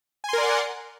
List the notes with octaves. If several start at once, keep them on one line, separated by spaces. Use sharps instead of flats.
A#4 D5 F#5 G#5 C6